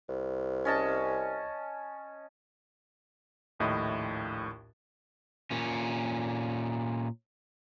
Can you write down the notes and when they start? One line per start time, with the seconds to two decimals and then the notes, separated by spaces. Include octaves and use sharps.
0.09 C2
0.65 C#4 D#5 A5
3.60 A#1 D#2 A2 E4 D#5 D#6
5.51 A#2 C#4